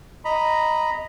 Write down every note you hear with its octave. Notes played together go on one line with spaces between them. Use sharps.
D#5 A#5 B5